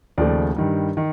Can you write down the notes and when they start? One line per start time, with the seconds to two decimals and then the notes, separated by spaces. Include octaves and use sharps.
0.18 D#2 C#3 F3 A3 D5
0.56 G2 D#3 G3
0.97 D#3